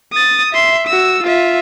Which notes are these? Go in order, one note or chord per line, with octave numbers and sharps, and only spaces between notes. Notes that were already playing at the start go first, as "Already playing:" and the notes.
D#6 A6
E5 C6
F#4 E6
F4 E5